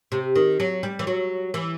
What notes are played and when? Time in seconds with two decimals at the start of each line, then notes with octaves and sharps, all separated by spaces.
0.12 C3
0.36 D#3
0.60 F#3
0.83 G3
0.99 E3
1.07 F#3
1.54 E3